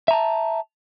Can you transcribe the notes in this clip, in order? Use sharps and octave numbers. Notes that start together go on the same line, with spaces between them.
E5 A5 A#5